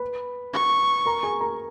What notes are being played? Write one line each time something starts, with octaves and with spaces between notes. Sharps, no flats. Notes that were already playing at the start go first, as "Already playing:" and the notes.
Already playing: B4 B5
C#6
A#4 A#5
G#4 G#5
A#4 A#5